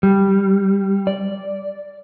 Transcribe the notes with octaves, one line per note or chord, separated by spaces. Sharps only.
G3
D5